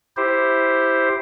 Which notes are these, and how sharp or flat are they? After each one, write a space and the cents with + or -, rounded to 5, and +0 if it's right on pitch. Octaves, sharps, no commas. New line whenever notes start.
E4 +0 G4 +0 C5 +0